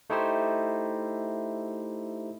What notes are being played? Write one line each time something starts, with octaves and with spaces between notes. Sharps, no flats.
A3 D#4 E4 G4 C5